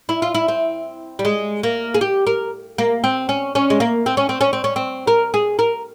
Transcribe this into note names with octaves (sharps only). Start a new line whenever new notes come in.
E4
F4
E4
C4
G3
G#3
A#3
G#4
G4
A#4
A#3
C4
C#4
C#4
G#3
A#3
C4
C#4
C4
C#4
C4
C#4
C4
A#4
G#4
A#4